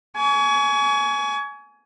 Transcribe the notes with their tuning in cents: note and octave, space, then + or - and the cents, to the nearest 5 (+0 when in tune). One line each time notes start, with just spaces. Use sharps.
G#5 +20 C#6 +35